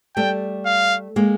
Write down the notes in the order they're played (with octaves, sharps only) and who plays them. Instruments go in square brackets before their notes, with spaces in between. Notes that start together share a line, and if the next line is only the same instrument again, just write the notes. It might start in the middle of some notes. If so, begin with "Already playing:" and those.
[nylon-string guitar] G3 A3 [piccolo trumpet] G5
[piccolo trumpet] F5
[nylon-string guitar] G#3 A#3